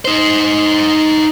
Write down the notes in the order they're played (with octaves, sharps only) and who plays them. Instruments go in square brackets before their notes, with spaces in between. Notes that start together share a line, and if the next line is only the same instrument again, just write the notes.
[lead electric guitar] D#4 C5